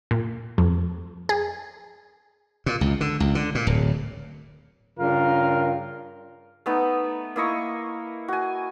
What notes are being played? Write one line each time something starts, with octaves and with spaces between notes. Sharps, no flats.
A#2
F2
G#4
A#2
C#2
D3
C#2
D3
A#2
D1
G2 C#3 F4 A#4
A3 B3 D#4
A#3 E4 D#5 C#6
F#4 G#5